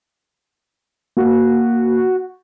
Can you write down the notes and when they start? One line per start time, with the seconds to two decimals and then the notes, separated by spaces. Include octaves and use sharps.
1.17 A#3 F#4